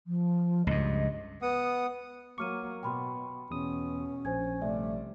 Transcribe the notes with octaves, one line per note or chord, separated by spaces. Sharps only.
F3
C#2 G2 D#5
B3 F#5 D#6
F#3 A#3 C#6 D6 F6 D#7
B2 G5 B5 C6
E2 B2 C#4 D#6
A#1 C5 G#5 G#6
C3 G3 A3 D5 E5